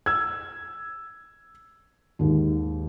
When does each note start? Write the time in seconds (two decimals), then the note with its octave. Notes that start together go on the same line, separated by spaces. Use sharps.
0.06 E6 G#6
2.19 D#2 G#2